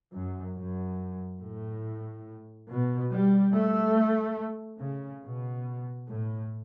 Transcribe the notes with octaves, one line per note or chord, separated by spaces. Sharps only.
F#2
F#2
A2
B2
G3
A3
C#3
B2
A2